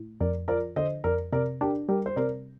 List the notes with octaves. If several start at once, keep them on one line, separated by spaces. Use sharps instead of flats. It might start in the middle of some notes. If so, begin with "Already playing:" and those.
Already playing: A2
F2 A#4 D5
F3 A#4 D5
D3 C5 D#5
F2 A#4 D5
C3 A#4 D5
D4 G4 A#4
G3 G4 A#4
C5
C3 A#4 D5